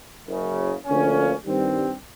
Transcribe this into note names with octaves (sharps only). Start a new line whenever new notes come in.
F#1 F#2 C#3
D2 D3 F3 A#3 C#4
G2 D#3 G3 C4